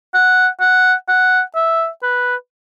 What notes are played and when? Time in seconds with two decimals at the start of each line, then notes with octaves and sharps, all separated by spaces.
0.14 F#5
0.60 F#5
1.08 F#5
1.55 E5
2.03 B4